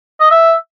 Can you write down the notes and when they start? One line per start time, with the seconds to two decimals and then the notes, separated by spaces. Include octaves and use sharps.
0.21 D#5
0.31 E5